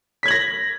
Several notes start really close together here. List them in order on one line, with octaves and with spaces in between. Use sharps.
B6 G#6 F#7 A#6